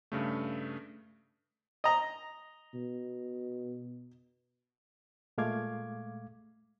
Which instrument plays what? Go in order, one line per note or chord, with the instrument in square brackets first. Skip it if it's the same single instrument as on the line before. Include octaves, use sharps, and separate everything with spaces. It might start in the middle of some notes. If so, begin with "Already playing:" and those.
[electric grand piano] G2 C#3 A3
[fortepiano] D#5 A#5
[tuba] B2
[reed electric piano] A#2 G#3 A3 F5 D6 G#6